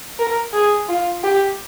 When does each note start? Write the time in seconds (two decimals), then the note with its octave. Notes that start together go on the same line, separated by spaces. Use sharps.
0.19 A#4
0.54 G#4
0.89 F4
1.24 G4